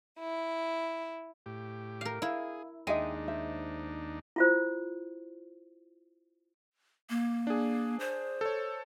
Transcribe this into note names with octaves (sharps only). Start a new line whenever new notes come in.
E4
A2 G4
A#4 F5
E4 G#4 F5
D#2 G#3 D4 D#4 D#5 E5 G5
C5 D#5 E5
E4 F4 C5
A#3
D4 G#4
C5
A4 C#5